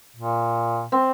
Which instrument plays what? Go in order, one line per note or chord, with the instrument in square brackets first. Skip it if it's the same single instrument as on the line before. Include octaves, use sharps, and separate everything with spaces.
[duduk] A#2
[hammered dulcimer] C4